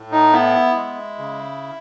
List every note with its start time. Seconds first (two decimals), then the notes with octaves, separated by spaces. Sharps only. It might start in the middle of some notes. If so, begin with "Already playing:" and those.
Already playing: A2
0.12 D#4
0.32 B3 E4
0.75 G#3
1.19 C#3